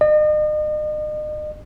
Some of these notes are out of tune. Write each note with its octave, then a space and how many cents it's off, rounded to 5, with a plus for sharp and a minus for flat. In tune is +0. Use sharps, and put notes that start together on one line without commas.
D#5 -40